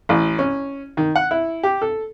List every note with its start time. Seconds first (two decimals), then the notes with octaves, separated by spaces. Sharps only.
0.09 A1
0.39 C#4
0.97 D#3
1.16 F#5
1.31 E4
1.63 G4
1.82 A4